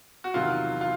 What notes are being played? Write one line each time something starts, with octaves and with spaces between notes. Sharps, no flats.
F#4
E2 C3 D#3 F#3 F4
F4